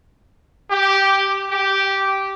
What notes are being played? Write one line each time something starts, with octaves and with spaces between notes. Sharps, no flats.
G4
G4